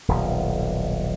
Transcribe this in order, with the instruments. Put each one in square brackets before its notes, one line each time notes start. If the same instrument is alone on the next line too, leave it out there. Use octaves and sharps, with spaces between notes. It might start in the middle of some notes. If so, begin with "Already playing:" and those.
[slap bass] D#1 B1